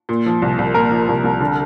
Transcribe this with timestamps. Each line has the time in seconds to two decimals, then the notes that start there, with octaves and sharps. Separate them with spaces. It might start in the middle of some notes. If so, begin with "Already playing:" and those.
0.09 A#2
0.26 F3
0.42 C2
0.58 C2
0.74 A#2 A#4
0.91 F3
1.09 C2
1.24 C2
1.41 D3